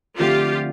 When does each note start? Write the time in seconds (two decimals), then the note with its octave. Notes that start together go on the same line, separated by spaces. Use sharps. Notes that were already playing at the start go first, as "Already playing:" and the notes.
0.19 D3 F3 A3 C4 F4 G4